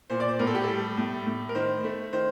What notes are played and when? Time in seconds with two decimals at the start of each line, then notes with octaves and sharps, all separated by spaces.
0.10 A#2 C5
0.20 D5
0.29 C5
0.39 A2 A#4
0.47 A4
0.55 G4
0.64 G3 A4
0.97 A2
1.26 A2
1.49 A#4
1.55 D#3 C5
1.84 A3
2.13 D#3 C5